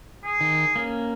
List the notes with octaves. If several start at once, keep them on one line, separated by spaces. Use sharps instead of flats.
G#4
D#3
A#3 C#4